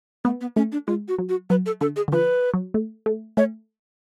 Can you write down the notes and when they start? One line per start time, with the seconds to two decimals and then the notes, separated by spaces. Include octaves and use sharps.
0.25 A3 B3
0.41 B3
0.56 A3 C#4
0.72 D4
0.88 G#3 F4
1.08 F#4
1.18 F#3
1.29 F#4
1.50 F#3 B4
1.66 A4
1.81 D3 A4
1.96 G#4
2.08 D3
2.12 F3 B4
2.54 F#3
2.74 A3
3.06 A3
3.37 A3 C#5